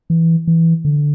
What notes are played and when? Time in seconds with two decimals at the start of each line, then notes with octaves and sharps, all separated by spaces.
0.10 E3
0.47 E3
0.85 D3